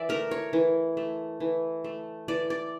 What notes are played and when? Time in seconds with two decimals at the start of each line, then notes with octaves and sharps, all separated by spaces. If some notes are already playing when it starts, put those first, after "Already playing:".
Already playing: E3 D5 E5
0.09 A3 A#4
0.31 C#5
0.53 E3
0.97 A3
1.40 E3
1.84 A3
2.28 E3 D5
2.50 D5